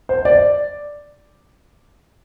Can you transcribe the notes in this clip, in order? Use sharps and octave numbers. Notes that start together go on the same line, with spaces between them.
C5
D5